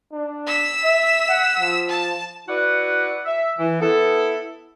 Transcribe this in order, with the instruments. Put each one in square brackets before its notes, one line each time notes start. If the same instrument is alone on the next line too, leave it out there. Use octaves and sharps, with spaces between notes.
[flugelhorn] D4
[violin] E6 B6
[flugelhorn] E5
F#5
F3
[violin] A5
[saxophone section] E4 F#4 B4 D5 F#5
E5
E3
B3 E4 A4